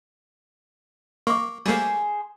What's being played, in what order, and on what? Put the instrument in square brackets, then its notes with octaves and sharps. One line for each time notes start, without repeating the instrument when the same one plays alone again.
[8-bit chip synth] A#3 [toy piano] C#6 D6
[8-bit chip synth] G3 A3 A#3 [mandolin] G#4 C5